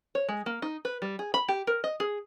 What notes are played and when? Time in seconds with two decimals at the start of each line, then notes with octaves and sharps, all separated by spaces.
0.15 C#5
0.29 G#3
0.46 A#3
0.62 D#4
0.85 B4
1.02 G3
1.19 G#4
1.34 B5
1.48 G4
1.67 A#4
1.84 D#5
2.00 G#4